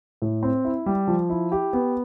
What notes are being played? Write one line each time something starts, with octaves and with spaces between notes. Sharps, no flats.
A2
C4
E4
G3
F3
E4
G4
B3